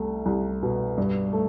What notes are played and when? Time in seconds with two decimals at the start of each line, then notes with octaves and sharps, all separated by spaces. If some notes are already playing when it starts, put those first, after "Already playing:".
Already playing: C2 A3
0.26 C2
0.63 B2
0.98 G2
1.33 A3